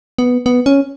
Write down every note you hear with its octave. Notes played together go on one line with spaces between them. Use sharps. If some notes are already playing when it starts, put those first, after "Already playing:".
B3
B3
C#4